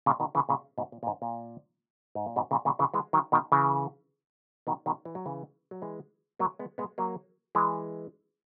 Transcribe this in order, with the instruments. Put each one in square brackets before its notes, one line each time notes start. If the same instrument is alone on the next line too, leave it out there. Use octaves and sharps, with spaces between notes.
[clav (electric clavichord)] A#2 C#3
B2 D#3
C#3 E3
A#2 C#3
G#2 B2
A#2
A#2
G#2
A#2
G#2
A#2
G#2 B2
A#2 C#3
A#2 C#3
C#3 E3
E3 G#3
D#3 F#3
B2 D#3
C#3 E3
B2 D#3
B2 D#3
E3
F#3
C#3 E3
F#3
E3 G#3
F#3 A#3
G#3 B3
G#3 B3
F#3 A#3
E3 G#3